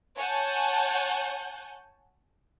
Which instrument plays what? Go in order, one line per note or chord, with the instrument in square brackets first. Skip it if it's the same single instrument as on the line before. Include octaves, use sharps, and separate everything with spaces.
[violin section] C#5 F#5 G#5 A5 G6